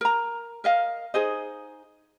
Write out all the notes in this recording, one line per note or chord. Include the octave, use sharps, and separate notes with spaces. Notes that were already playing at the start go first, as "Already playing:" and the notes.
A#4 A#5
A#4 D#5 F5
D#4 G#4 C5 D#5